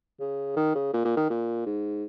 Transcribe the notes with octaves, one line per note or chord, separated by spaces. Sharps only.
C#3
D#3
C#3
A#2
A#2
D#3
A#2
G#2